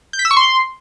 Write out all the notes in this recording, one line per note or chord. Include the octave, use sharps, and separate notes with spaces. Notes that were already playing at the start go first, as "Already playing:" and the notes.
G6
B6
E6
C#6
C6